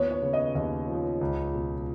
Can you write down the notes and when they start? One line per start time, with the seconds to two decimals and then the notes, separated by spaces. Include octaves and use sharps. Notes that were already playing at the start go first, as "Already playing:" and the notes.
Already playing: D#2 F3 B3 C#5
0.11 C#5
0.22 C#3
0.33 D#5
0.55 D#2 D#5
0.88 F3
1.21 C#2
1.54 B2